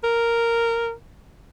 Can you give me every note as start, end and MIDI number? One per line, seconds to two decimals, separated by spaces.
0.04 0.92 70